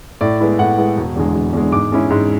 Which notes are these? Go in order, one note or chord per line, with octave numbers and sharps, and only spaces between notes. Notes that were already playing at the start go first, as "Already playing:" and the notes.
A2 D5
G#3 B3 E4
A2 F#5
G#3 B3 E4
E1
E2 D3 G#3
E1
E2 D3 G#3
G#2 D6
G#3 C#4 E4
G#2